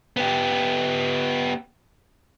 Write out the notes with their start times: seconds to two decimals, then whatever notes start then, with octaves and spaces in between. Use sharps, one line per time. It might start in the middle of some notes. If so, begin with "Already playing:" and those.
0.17 B3 G4